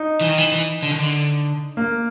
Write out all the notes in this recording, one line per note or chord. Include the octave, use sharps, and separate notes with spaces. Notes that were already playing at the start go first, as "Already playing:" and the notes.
Already playing: D#4
E3
D#3
E3
E3
D3
D#3
D3
A#3